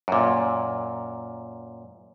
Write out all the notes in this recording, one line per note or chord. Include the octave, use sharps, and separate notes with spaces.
F#2 A#2